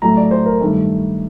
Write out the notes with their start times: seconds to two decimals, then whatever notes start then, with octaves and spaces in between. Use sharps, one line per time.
0.02 A2 F#3 A3 A#5
0.16 D5
0.31 C5
0.46 A#4
0.60 G2 D#3 A3